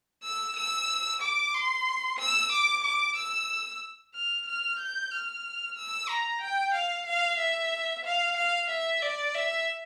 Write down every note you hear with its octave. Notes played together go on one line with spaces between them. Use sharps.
E6
E6
D6
C6
E6
D6
D6
E6
F6
F6
G6
F6
E6
A#5
G5
F5
F5
E5
F5
F5
E5
D5
E5